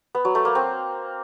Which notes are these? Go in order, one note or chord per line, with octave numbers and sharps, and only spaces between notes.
B3
F#3
A3
A#3
C4